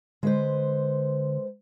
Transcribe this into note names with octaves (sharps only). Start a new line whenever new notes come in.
D3 G#3 B4 C5